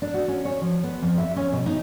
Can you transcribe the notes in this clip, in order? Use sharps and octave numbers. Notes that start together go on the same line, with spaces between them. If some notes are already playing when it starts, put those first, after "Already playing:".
D4
F#4
C#4
C#5
F3
B3
F2
E5
C#4
B2
D#4